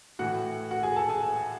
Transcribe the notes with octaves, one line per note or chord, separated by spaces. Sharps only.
A2 E3 F#4 F#5
F#4 F#5
G#4 G#5
A4 A5
G#4 G#5